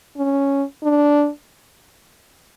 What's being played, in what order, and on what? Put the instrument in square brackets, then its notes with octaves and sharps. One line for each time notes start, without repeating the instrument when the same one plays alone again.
[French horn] C#4
D4